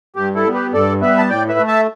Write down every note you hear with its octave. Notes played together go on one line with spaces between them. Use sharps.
G2 G4
E4 A4
G3 B3
G4 B4
G2 A4 D5
G3 B3 B4 E5
A5
A2 D5 G5
B4 E5
A3
E5 A5